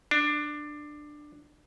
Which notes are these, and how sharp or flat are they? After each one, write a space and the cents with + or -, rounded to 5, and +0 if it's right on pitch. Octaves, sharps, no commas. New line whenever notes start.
D4 +15